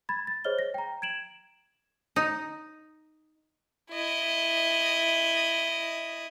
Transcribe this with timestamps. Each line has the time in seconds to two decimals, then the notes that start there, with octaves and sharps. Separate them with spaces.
0.09 B5 G#6 A6
0.27 A6
0.45 G#4 C5 C#5 D#5 F6 G7
0.59 A#6
0.74 G5 A#5
1.02 G#6 D7 E7 F#7
2.16 D#4
3.92 E4 D#5